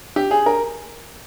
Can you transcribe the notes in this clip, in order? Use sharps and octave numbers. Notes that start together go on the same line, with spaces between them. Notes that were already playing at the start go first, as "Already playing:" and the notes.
G4
G#4
A#4